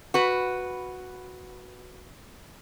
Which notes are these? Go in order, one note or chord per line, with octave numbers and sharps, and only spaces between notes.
F#4 B4